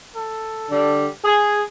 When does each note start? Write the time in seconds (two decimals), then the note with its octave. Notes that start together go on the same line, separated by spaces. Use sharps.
0.16 A4
0.70 D3 G3
1.25 G#4